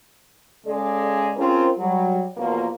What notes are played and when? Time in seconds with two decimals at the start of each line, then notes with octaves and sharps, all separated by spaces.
0.65 C#3 G#3 G#4 A4 D5
1.36 C4 C#4 F4 G#4 A#4 C5
1.77 F#3 G3
2.36 E2 B2 F3 A#3